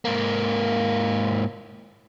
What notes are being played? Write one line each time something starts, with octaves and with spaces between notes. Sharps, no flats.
G#2 A#3